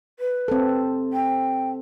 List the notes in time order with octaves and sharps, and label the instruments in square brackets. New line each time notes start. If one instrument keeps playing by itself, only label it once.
[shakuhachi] B4
[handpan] C4 A4
[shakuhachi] G5